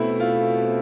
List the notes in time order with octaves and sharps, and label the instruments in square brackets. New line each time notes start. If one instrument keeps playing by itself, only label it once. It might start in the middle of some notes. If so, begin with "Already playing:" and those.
Already playing: [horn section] B2 A3 C4 [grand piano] B3 E4
[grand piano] F4